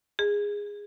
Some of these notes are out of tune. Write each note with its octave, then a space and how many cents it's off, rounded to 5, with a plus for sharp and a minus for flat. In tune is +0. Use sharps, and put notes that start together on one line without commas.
G#4 -15